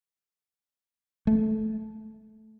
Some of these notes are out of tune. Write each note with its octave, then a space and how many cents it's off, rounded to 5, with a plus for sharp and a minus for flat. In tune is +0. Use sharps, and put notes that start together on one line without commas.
A3 -15